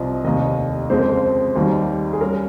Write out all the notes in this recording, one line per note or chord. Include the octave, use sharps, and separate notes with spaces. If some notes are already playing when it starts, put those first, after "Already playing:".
Already playing: C2 C3 F3 C4 D#5
F1 D#2 D#3 D#5
F2 C#3 G#3 C4 C5
A#4
C5
D#2 D#3 G3
G#4
G3 C#4 A#4